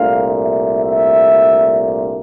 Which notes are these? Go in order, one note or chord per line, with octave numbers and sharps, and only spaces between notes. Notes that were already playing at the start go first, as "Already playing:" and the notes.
Already playing: C2 A#2 A3 D4 F5
E5
E5